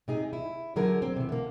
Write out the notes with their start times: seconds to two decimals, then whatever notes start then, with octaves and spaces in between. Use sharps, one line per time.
0.08 C3 D#4 G#4
0.33 E4
0.76 D3 F#3 G#4 A#4
1.02 C4
1.16 C3 E3
1.29 D3 A#3